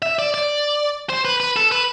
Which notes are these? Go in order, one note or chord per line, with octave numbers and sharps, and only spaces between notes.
E5
D5
D5
C5
B4
B4
A4
B4